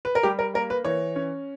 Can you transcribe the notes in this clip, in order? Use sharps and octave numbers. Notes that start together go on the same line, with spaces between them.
B4
A#4
G3 G4
A#4
A#3 A#4
B4
E3 C#5
C#4